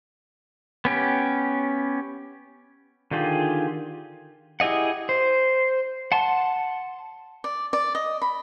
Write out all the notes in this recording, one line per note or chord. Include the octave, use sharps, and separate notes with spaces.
B3 C#4 G4
D3 D#3 F4 G4 G#4
E4 G4 G#4 D#5 F#5
C5
F#5 A5 C6
D5
D5
D#5
B5